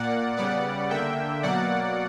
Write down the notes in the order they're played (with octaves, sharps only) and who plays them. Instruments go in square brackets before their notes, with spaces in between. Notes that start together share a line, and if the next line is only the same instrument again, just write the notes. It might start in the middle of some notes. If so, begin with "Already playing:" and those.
Already playing: [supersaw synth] A#2 A#3 D5 F#5
C#3 G3 B3 D5 F#5
D3 A#3 E5 G5
B2 F#3 A#3 D5 F#5